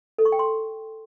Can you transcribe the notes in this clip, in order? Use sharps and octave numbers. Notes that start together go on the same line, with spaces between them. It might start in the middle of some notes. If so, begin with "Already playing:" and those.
A4
C#6
G5
C6